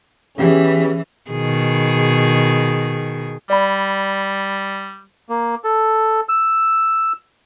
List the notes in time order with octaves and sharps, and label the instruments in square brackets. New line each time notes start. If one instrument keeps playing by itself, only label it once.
[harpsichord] E2 G4 [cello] E3 [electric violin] C#4 G#4
[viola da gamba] B2 D#3 G#4
[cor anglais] G3 [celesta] D5 B5
[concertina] A#3
A4
E6